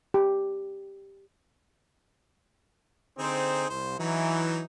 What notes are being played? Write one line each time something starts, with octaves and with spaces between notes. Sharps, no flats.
G4
D3 C4 D#4 G#4 C5
C2 C5
E3 F#3 D#4